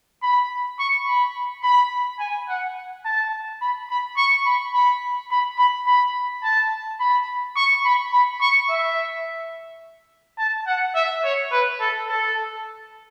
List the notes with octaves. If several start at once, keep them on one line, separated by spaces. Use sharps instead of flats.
B5
C#6
B5
B5
G#5
F#5
A5
B5
B5
C#6
B5
B5
B5
B5
B5
A5
B5
C#6
B5
B5
C#6
E5
A5
F#5
E5
C#5
B4
A4
A4